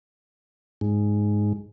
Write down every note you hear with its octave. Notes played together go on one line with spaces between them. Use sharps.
G#2